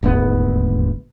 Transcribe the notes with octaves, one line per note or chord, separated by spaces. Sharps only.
D#1 G#1 D2 B3